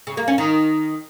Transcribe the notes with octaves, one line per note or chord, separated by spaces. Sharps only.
C#3
A#3
C#4
D#3